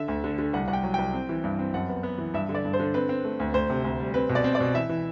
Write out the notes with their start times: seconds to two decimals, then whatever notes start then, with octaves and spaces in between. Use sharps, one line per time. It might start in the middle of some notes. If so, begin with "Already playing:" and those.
Already playing: D3 E5
0.08 D2
0.24 D3
0.38 D3
0.53 C2 F#5
0.68 C2 F#5
0.73 G5
0.84 F#3
0.94 C2 G5
1.13 C4
1.29 E3
1.44 G2
1.59 C4
1.74 F#2 F#5
1.89 B3
2.03 B3
2.18 E3
2.34 G2 E5
2.49 D3
2.55 D5
2.65 G2
2.73 C5
2.80 D3
2.94 C4 B4
3.09 C4
3.24 A3
3.40 D2
3.54 D2 C5
3.70 C3
3.84 D2
4.00 G3
4.14 C4 B4
4.29 B2
4.35 D5
4.44 C4
4.55 D5
4.60 B2
4.74 E3 E5
4.89 E3